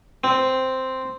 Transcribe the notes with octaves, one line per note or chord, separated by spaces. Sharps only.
C4